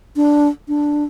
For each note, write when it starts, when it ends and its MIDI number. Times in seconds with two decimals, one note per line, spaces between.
0.16 0.48 62
0.68 1.04 62